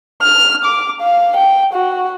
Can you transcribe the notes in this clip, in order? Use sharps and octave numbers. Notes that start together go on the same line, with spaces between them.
F6
D6
F5
G5
F#4